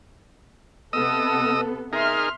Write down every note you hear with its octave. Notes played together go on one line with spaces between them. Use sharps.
C3 B3 A4 D#5 D#6 E6
D#4 G#4 A#4 E5 C6 F6